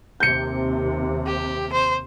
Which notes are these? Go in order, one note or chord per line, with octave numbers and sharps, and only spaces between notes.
D#2 C3 G6 C#7
G4
C5